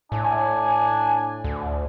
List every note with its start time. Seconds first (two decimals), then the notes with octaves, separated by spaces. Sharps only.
0.12 A2 D4 G#5
1.44 D2